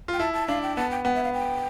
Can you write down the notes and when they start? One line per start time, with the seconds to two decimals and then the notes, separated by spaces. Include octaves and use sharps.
0.08 F4 G5
0.19 E4 A5
0.34 A5
0.48 D4 F5
0.63 G5
0.77 B3 A5
0.91 G5
1.05 B3 G5
1.15 E5
1.24 F5
1.34 G5